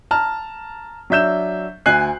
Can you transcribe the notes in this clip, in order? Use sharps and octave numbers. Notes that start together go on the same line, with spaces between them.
A5 A#5 F6
F#3 D4 E5 G6 E7
D2 G#5 F#6 C7